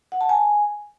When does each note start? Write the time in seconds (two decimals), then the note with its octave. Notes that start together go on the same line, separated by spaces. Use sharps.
0.12 F#5
0.21 A5
0.29 G#5